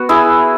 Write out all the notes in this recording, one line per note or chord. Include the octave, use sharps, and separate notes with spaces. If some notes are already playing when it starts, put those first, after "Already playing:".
Already playing: B3 F#4
E4 G#4